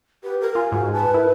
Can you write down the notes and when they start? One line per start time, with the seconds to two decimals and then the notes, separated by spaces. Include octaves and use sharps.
0.24 G4 B4
0.41 A#4
0.55 F4 G#5
0.72 G#2 F#4
0.93 B4 A5
1.14 E4 A#4